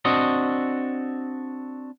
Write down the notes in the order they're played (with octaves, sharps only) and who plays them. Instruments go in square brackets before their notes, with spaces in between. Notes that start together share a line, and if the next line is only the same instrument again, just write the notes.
[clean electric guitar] C4 D4 F#4 D#5